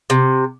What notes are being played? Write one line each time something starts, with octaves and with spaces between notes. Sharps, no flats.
C3